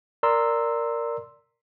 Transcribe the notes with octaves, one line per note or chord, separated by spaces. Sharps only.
A#4 D5 A#5 C6 E6